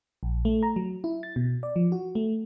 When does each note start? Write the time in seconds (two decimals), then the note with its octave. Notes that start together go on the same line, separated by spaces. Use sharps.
0.23 A#1
0.45 A3
0.63 A#5
0.76 F#3
1.04 E4
1.23 A6
1.36 B2
1.63 D5
1.76 F3
1.92 F#4
2.15 A3